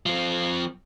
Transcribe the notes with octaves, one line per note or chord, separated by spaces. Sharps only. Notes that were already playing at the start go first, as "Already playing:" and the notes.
F3 C4